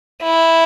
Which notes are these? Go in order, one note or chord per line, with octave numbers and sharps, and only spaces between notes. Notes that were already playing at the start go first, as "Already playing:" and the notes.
E4